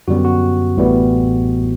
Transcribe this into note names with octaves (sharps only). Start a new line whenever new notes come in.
F#2 D3 G3 B3 F#4
F#4
A1 A2 E3 G3 B3